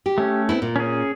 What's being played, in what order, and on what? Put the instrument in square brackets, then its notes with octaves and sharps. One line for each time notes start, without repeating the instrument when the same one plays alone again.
[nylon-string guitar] G4
[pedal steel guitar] A3 C#4
[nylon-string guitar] B3 C4 E4
A#2
[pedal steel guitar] C#4 G#4